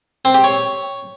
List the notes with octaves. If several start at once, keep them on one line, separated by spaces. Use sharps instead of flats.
C4
G4
C#5